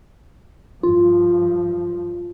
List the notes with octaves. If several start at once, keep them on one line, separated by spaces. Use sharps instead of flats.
G2 F3 F4